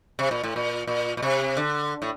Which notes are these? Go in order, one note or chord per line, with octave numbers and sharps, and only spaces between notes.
C3
A#2
A2
A#2
A#2
A#2
C3
D3
A2